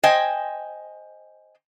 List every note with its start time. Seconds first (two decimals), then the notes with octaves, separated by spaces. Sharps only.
0.03 C5 D#5 G5 G#5